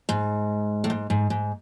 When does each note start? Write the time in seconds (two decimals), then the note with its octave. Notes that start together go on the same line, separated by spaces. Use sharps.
0.09 G#2
0.84 A2
0.90 G#2
1.10 G#2
1.30 G#2